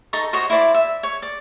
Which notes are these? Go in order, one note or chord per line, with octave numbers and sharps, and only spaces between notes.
D#4 A4 A#5 C#6
F#4 C5 C#5 D#5
E4 C5 D5 D6
E5
C#5
D5